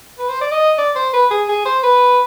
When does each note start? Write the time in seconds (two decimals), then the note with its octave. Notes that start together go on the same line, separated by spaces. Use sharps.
0.19 B4
0.29 C5
0.41 D5
0.52 D#5
0.78 D5
0.96 C5
1.13 B4
1.31 G#4
1.49 G#4
1.66 C5
1.83 B4